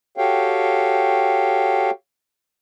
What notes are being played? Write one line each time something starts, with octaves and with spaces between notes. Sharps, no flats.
F#4 G4 A4 C#5 F5 G5